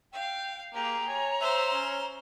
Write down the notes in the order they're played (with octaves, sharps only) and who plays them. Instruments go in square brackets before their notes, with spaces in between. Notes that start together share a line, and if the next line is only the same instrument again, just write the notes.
[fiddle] F5 [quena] G5
[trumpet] A#3 [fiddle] G4 G#4 [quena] A#5
[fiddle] C#5 [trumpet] G#5
[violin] C5 [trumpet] E5
[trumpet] C#4